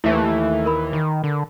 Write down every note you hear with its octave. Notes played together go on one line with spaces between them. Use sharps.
D#2 E3 A3 E4 E5
A#4 B5
D#3
D3